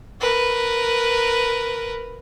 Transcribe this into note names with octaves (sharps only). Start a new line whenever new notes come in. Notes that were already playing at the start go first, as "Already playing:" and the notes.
A#4 B4